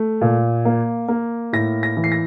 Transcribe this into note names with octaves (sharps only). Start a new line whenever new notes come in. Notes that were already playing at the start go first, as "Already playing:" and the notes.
Already playing: A3
A#2
A#3
A#3
A2 A#6
A#6
E3
C7
A#6